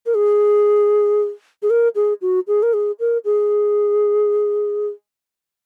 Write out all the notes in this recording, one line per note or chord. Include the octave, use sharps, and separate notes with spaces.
A#4
G#4
G#4
A#4
G#4
F#4
G#4
A#4
G#4
A#4
G#4